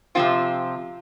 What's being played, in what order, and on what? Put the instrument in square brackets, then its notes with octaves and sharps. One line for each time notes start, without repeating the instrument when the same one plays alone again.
[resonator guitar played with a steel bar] C3 F3 C4 F4